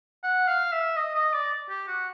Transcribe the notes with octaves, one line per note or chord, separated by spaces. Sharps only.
F#5
F5
E5
D#5
D#5
D5
G4
F#4